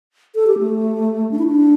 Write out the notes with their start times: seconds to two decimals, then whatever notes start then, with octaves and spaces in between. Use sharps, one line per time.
0.35 A4
0.47 G4
0.59 A3
1.31 D4
1.39 E4
1.46 D4